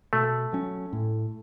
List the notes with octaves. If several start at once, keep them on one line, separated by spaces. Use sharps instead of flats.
B2 A3
F#3 C#4
A2